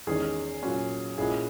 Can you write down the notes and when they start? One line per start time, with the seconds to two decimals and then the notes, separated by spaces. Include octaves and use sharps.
0.07 E2 D#3 G#3 C#4 G#4
0.63 A#2 F#3 C#4
1.18 A#2 G#3 C#4 E4 G#4